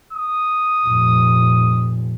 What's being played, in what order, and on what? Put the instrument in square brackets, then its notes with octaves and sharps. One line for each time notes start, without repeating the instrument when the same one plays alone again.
[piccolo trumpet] D#6
[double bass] F1 A#2